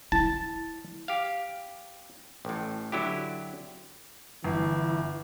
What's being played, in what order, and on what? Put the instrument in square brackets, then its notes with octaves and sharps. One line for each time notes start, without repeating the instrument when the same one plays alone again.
[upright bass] E4 [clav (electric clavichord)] A5
[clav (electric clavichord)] G4 F5
A1 A2
D3 F#3 E4 G4
[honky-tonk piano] G1 [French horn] E3